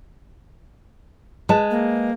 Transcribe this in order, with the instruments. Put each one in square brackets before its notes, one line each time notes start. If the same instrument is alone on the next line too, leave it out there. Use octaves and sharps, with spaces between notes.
[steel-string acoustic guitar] G#3 [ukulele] B4 A5
[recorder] A#3